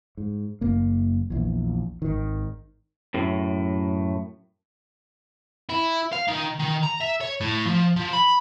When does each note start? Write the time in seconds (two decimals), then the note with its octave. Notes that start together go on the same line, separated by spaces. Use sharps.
0.17 G#2
0.61 F#1 A#3
1.30 A#1 E2
2.02 G#1 D#3
3.14 F#2 A2
5.70 E4
6.13 F5
6.28 D#3
6.60 D#3
6.83 A#5
7.02 E5
7.21 C#5
7.41 A2
7.66 F3
7.97 F3
8.13 B5